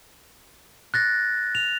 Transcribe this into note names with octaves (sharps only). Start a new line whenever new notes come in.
F#6 A6 A#6
F7